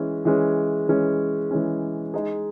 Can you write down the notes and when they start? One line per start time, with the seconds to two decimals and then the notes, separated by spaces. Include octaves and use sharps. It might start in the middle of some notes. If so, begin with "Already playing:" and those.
Already playing: E3 G#3 C#4
0.25 E3 G#3 C#4
0.88 E3 G#3 C#4
1.51 E3 G#3 C#4
2.14 G#3 D#4 G#4